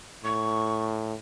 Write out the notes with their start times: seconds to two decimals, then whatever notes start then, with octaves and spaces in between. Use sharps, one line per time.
0.24 A2 C#6